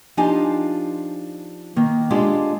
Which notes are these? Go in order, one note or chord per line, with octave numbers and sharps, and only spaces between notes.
F3 D4 D#4 F4 G4 G#5
D#3 A#3
G#3 D4 F4 G4 A4